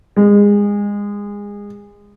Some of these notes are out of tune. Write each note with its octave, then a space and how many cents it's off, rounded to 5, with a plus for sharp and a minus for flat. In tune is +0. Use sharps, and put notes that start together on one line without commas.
G#3 -25